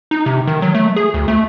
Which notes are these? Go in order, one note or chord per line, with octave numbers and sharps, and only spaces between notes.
D#4
C3
D#3
F#3
A3
G#4
D2
A3